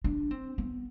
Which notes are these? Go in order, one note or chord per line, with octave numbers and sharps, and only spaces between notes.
D4
C4
B3